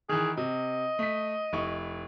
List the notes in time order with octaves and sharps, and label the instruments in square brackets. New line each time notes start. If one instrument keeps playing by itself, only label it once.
[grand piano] D#3 E3 [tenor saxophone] G#4
[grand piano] C3 [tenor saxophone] D#5
[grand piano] A3 B6
F1 E4 C#6